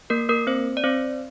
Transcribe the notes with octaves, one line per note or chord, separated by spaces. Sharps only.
A#3 A#4
A#3 A#4
C4 C5
D5
C4 C5